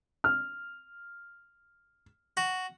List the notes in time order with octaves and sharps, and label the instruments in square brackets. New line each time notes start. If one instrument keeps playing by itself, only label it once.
[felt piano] F6
[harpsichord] F#4